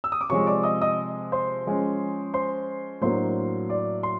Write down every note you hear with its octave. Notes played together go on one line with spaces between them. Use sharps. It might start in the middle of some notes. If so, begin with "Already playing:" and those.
E6
D#6
D6
C3 F3 G#3 C#5 C#6
D5 D6
D#5 D#6
D#5 D#6
C5 C6
F3 G#3 C#4
C5 C6
A2 F#3 A#3 D4 C5 C6
D5 D6
C6